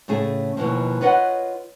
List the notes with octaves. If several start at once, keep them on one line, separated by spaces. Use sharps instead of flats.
A2 C#3 A3 G#4
D#2 B2 E3 F3
F4 B4 C#5 D#5 F#5